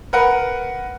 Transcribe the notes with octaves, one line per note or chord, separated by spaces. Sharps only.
A#4 B4 F#5